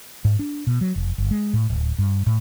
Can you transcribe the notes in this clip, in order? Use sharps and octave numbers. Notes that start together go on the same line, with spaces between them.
G#2
D4
B2
F#3
F1
G1
G#3
A2
D1
G2
A2